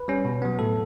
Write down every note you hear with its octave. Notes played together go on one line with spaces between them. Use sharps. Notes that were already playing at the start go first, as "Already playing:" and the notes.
Already playing: B4
G3 C#4
B2
F#3 B3
A2 A4